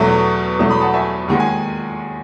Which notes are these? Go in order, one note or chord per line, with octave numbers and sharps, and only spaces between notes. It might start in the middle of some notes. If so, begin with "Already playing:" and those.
Already playing: E2 B2 F#3 A3
E2 B2 F#3 A3
B5 D#6
F#5 A5
E5 G#5
D#2 D#3 G#3 F#5
G#5